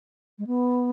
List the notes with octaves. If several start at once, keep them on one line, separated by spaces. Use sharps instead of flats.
G#3
B3